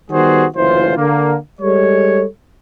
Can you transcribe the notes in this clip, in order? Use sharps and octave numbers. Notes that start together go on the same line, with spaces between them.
D#3 G3 B3 F#4 G#4 C5
F#1 D2 E3 F4 C5
D3 A#3
G3 G#3 A4 C#5